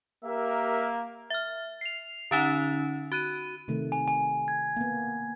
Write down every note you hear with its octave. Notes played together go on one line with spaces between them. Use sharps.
A#3 G4 A#4 E5
E5 F6
C7 F7
D3 C#4 D#4
F#4 F#6 D#7
C3 D#3 A3
G#5
G#5
G#6
A#3 B3